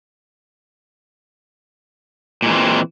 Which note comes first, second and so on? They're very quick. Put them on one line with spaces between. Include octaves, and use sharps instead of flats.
A#2 G#3 E3 C4